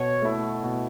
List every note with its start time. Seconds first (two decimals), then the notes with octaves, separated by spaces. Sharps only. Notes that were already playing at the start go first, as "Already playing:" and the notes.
Already playing: B2 C#5
0.22 A3 E4
0.64 B2